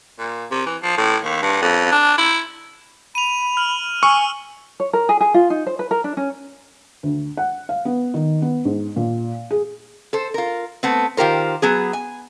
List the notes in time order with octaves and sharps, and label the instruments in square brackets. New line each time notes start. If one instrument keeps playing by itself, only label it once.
[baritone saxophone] A#2
C3
E3
F3
A2
D#2
G2
F2
D4
E4
[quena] B5 [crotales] D#7 F7
[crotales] F6 F#7
[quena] G#5 [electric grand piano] C#6 [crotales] E6 F6
[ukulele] C#5
A#4
G#4
G#4
F4
D#4
C5
B4
A#4
D4
C#4
[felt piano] D2
F#5
F5
B3
D#3
B3
G#2
A#2
G#4
[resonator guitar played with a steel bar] A4 C5
F4 A#4
A3 B3 C4
D#3 F4 G4 A#4 C5
F#3 B3 G#4
G#5